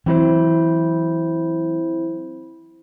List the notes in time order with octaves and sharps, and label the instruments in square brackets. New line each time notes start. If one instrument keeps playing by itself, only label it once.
[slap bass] E3 F#3 [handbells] C4 E4 C5